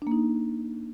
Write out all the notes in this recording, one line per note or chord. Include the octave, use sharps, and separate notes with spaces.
A#3 D4 D#4